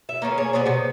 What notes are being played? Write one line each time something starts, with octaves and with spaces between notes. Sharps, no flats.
E5
A#3 B3 C#4 G#4
G#4 C#5
B3 G#4 C5 D5
C3 B3